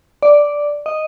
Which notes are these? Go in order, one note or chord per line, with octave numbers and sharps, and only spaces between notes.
D5
D#5